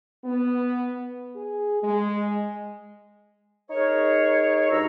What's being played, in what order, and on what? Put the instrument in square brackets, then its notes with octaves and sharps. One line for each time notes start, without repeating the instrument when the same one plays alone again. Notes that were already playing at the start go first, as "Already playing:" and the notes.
[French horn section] B3
G#4
G#3
[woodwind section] D#4 G#4 A#4 C#5
G2 D#4 F#4 A#5 E6